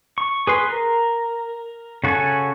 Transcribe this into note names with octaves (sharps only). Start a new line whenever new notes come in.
C#6
G#4 B4 C6
A#4
C#3 F#4 A4 G#5